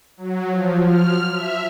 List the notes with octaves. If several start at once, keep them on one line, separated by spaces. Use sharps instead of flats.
F#3
F3
F6
E5